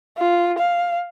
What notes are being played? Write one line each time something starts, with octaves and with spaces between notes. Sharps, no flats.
F4
F5